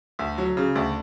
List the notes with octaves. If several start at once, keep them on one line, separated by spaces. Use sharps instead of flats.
D2
F#3
C#3
D2